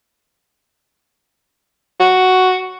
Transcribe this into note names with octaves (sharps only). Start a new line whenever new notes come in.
F#4